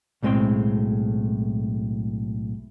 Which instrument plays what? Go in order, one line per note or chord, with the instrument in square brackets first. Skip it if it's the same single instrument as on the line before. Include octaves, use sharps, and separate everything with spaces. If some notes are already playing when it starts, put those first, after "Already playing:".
[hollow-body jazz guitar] B1 A2 G#3 C4 G5 C6